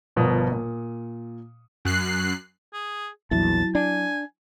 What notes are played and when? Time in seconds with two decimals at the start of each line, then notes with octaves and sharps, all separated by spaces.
0.16 G1 B2 F3 A#4 D#6
0.52 A#2
1.85 F#2 F#6 C7
2.74 G#4
3.31 A#1 E2 F#3 E4 A5
3.75 D4 G#5